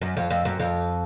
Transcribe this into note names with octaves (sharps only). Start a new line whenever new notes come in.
F#2
F2
F2
F#2
F2